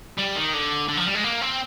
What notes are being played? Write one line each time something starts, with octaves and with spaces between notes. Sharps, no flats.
G3
D#3
D3
D3
F3
G3
G#3
A#3
C4